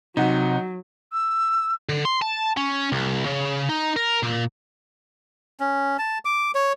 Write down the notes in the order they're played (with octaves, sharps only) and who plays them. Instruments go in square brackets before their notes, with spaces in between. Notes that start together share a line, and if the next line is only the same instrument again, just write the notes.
[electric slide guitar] C3 [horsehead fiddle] F#3 [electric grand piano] D#4 F#5
[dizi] E6
[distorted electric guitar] D3
C6
A5
C#4
C2
C#3
D#4
A#4
A#2
[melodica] C#4
A5
D6
C#5